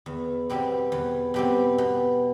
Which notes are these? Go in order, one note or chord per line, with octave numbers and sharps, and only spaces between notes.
E2
B2 G3 C4 G4
E2
B2 G3 C4 G4
B2